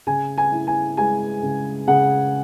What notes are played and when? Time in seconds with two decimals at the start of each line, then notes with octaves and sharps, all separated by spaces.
0.07 C#3 G#5
0.38 G#5
0.52 E4
0.67 G#5
0.97 G#3 G#5
1.43 C#3
1.88 C#3 F#5